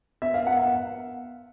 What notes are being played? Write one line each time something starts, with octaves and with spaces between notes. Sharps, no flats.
B3 E5
F5
B3 F#5
F#5